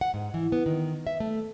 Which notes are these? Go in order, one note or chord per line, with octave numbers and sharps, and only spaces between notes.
F#5
G#2
E3
B3
D#3
E5
A3